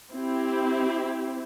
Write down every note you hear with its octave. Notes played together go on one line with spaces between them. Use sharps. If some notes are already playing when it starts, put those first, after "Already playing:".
C4 E4 G4